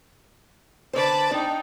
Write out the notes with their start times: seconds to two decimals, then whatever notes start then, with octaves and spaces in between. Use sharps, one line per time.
0.93 D3 B4 C5 D5 A5
1.31 D4 D#4 G5